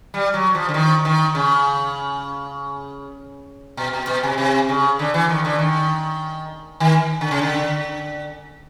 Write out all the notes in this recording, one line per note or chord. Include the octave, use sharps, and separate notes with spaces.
G3
F#3
F3
D3
D#3
D#3
C#3
B2
B2
B2
C3
C3
C#3
D3
E3
D#3
D3
D#3
D#3
D3
C#3
D3